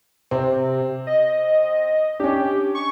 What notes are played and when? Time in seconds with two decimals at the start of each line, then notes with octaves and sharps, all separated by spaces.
0.31 C3 C4
1.07 D#5
2.20 C#4 D4 G4
2.75 C#6